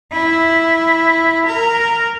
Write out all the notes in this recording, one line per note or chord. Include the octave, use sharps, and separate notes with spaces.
E4
A#4